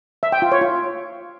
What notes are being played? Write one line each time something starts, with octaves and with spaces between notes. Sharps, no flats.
E5
G5
F4
C#5
F4